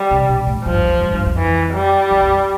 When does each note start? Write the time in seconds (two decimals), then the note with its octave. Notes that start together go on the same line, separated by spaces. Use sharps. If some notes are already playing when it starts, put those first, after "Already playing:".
Already playing: G3
0.11 C3
0.29 B2
0.47 A2
0.65 G2 F3
0.77 E2
0.89 F2
1.01 G2
1.13 G2
1.26 F2
1.37 E3
1.74 G3
2.11 F2
2.22 F2